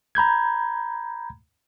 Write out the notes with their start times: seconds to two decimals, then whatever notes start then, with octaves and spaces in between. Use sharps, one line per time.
0.15 A#5 B5 G6 G#6